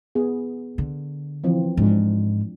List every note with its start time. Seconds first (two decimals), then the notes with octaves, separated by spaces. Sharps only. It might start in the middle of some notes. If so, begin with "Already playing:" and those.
0.15 B3 G#4
0.78 D3
1.44 E3 F3 C4
1.77 G#2 F3 D4